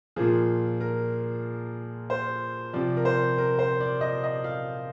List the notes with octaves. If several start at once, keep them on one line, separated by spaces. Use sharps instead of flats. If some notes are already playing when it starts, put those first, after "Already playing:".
A#2 F3 G#4
A#4
C5
C3 F3 D5
A#4
C5
A#4
C5
D5
D#5
D#5
F5